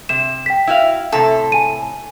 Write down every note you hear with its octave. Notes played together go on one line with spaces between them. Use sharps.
C3 E7
G5 B6
E4 F#4 F5
A2 C3 A4
G#5 D#7